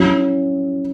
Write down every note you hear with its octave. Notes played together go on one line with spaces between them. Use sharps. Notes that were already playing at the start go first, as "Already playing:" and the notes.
Already playing: F#3 C#4 E4